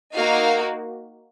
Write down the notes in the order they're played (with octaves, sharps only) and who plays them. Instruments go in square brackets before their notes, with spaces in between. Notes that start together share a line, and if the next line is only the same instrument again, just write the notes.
[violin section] A#3 D#4 F#4 F5